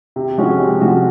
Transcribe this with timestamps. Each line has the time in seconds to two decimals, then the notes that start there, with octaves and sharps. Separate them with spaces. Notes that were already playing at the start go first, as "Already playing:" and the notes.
0.16 C3
0.38 F3 G#3 C#4 F#4
0.59 C3
0.81 F3 G#3 C#4 F#4